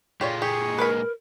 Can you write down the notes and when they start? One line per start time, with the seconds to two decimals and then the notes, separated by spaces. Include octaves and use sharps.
0.21 A#2 G#3 F4 G4 C#5 D5
0.42 G4 G#4 C#6
0.78 A#4 B4 B5